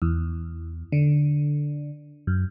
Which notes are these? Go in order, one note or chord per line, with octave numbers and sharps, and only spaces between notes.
E2
D3
F#2